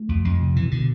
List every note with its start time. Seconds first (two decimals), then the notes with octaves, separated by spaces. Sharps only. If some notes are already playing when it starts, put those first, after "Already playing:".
Already playing: A3
0.09 F2
0.25 F2
0.40 C3
0.55 B2 E3
0.71 B2 D3